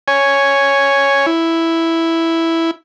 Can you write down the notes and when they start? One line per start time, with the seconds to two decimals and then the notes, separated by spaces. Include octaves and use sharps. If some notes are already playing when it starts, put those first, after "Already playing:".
0.08 C#5 G#5
1.26 E4